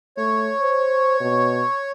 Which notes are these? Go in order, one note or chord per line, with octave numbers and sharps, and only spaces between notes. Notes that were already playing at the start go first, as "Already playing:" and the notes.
A3 C#5
C5
B2